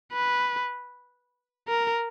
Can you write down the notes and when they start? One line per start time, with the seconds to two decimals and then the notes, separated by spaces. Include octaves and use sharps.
0.13 B4
1.68 A#4